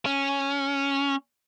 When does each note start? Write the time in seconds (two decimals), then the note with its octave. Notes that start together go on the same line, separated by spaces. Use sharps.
0.06 C#4